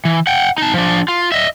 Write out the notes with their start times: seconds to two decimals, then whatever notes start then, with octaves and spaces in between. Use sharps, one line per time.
0.05 E3
0.27 F#5 G5
0.58 D#4 A5
0.74 F3 D4
1.08 F4
1.32 D#5 E5